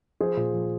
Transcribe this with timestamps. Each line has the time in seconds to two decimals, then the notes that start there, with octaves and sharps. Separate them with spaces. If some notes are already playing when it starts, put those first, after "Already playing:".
0.21 F3 G#4 C5
0.37 A#2
0.54 F3